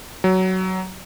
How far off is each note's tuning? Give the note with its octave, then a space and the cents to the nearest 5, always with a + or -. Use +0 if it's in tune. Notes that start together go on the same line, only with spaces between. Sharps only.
F#3 +15